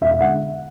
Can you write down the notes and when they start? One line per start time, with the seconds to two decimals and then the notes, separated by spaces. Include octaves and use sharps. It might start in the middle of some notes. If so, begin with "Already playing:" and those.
0.01 E1 E5
0.11 E5
0.21 D3 G#3 F#5